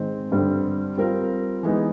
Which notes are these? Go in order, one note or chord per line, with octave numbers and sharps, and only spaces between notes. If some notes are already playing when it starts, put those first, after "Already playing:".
Already playing: G#2 D#3 G#3 C4
G2 D3 G3 C4
G3 C4 F4 A#4
E3 G#3 B3 D#4